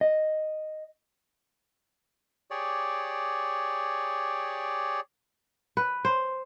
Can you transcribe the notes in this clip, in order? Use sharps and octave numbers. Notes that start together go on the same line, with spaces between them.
D#5
G4 G#4 C#5 D5
B4
C5